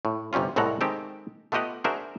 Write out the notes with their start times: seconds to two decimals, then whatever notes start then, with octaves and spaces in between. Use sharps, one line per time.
0.05 A2
0.33 G1 C3 G3 C#4 F4
0.56 C2 A2 G#3 A4 F#5 A#5
0.81 D#3 G#3 C4 G4 A4 G5
1.52 A3 B3 F4 G4 D#5 F#5
1.84 D4 F#4 G#4 A#4 C5 E5